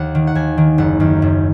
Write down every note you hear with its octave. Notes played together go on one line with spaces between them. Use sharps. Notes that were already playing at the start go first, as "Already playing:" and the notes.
Already playing: D#2 F#5
D#3
F#5
D#2 G#5
D#3
F#1 F#5
F#2 D#3
F#1